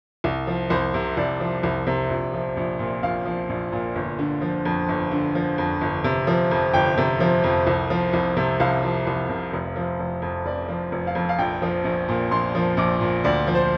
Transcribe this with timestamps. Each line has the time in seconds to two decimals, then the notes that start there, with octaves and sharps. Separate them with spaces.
0.24 C2
0.47 F3
0.70 C2 C5
0.94 C3
1.17 C2 D5
1.40 F3
1.63 C2
1.87 C3
2.09 A#1
2.33 F3
2.57 A#1
2.79 A#2
3.03 A#1 F5
3.25 F3
3.49 A#1
3.72 A#2
3.95 G1
4.19 D3
4.41 F3
4.65 F2
4.88 G1
5.11 D3
5.35 F3
5.58 F2
5.81 G1
6.04 C3
6.27 F3
6.51 F2
6.73 G1 G5
6.97 C3
7.20 F3
7.44 F2
7.67 C2
7.90 F3
8.13 C2
8.37 C3
8.60 C2 F5
8.83 F3
9.07 C2
9.29 C3
9.53 F1
9.76 F3
9.99 F1
10.22 F2
10.46 F1 D5
10.69 F3
10.92 F1
11.07 F5
11.15 F2
11.29 F5
11.38 A#1 G5
11.62 F3
11.84 A#1
12.09 A#2
12.31 A#1 C6
12.55 F3
12.77 A#1 D6
13.01 A#2
13.24 D2 D5
13.47 F3
13.55 C5